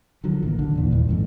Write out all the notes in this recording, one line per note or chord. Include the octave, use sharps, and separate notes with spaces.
D3 D#3 F3 F#3
A1 D#3 A#3
D3
E2 A#2 E3
G1 E2 G2 D#3
A1 F2 G#2